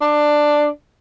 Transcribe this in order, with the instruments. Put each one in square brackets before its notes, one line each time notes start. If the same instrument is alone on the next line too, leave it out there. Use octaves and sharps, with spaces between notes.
[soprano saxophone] D4